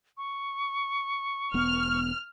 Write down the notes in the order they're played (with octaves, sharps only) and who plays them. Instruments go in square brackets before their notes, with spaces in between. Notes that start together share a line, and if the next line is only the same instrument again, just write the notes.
[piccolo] C#6
[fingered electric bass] E1 B3 [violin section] F6